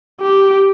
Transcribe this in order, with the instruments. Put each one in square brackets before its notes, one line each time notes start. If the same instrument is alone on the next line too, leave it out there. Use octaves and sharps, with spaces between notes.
[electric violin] G4